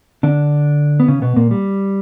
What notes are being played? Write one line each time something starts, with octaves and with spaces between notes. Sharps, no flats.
D3 D4
B3
C#3 C#4
B2 B3
A#2 A#3
G3